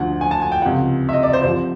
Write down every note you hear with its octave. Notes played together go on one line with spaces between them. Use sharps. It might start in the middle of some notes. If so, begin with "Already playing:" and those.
Already playing: D2 D3 F3 F#5
G#5
A5
G#5
G5
C#2 C3 F3 F#5
E5
D#5
D5
C5
C2 C3 F3 C5